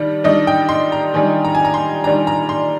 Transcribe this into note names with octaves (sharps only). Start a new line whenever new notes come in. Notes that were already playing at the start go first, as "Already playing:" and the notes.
Already playing: D#3 G3 D4
D#3 G3 D4 D#5
G5
C6
A#5
D#3 G3 D4 G#5
A#5
G#5
A#5
C6
D#3 G3 D4 A#5
A#5
C6